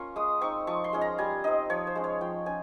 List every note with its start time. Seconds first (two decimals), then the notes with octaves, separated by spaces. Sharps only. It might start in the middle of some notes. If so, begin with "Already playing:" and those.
Already playing: A#3 C#4 F4 A#5 C#6
0.16 G#3 D#6
0.41 C4 D#4 C#6
0.67 F3 C#6
0.84 C6
0.93 G#3 C#4 F4
1.01 A#5
1.18 G3 G#5
1.44 C4 D#4 D#5
1.70 F3 C#5
1.87 C5
1.95 G#3 C#4
2.04 C#5
2.21 F3 G5
2.46 C#4 G#5